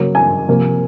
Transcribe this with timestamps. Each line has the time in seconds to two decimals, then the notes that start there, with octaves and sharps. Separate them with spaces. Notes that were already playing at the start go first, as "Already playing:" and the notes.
Already playing: C#3 F#3 A#3
0.15 G#5
0.48 C3 F3 A#3